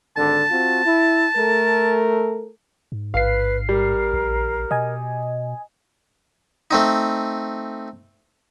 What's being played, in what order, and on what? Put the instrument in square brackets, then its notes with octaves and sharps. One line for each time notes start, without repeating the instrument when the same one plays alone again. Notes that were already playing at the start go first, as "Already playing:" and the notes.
[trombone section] G#1 D3 [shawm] A5
[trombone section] C4 F4 F#4
E4
A3 A4 A#4
[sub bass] G#2
[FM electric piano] A1 C7 [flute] B4 [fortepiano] F5
[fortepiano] G3 [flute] A#4
[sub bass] A#1
[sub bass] B2 [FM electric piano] D#5 G#5
[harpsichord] A3 C4 D#4